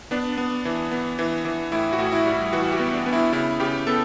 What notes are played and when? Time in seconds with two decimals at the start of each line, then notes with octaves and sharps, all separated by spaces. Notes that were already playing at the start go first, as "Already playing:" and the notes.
0.11 B3 D4
0.37 B3
0.65 E3
0.91 B3
1.19 E3
1.45 E3
1.72 A2 E4
1.93 F#4
1.98 A2
2.12 E4
2.25 G3
2.33 E4
2.53 E3 F#4
2.72 G4
2.79 B3
2.93 D4
3.06 B3
3.13 E4
3.33 C#3 E4
3.60 C#3 G4
3.87 B3 A4